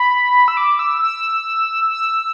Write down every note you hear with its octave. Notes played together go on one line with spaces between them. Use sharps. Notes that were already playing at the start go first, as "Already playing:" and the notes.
Already playing: B5
E6
D6
E6
E6
E6